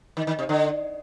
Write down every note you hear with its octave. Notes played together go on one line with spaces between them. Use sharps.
D#3
D#3
C3
D3